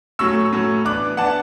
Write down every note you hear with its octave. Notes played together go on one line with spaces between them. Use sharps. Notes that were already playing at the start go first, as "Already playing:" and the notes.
A2 F#3 C#4 C#6 E6
A2 F#3 C#4
E3 B3 D4 D6 F#6
E3 B3 D4 F#5 A5